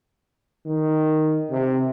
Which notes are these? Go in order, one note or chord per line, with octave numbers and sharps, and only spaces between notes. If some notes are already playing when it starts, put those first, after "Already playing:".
D#3
C3